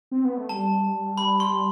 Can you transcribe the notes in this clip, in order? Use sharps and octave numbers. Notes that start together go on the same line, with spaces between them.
C4
B3
A3
G3 A5
B5
C6